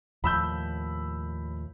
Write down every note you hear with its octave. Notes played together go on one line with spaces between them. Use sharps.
D#2 A2 F3 B5 E6 G6